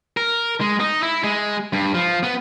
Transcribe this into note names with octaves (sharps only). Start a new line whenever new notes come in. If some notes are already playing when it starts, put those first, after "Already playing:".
A#4
G#3
D#4
E4
G#3
G2
F3
B3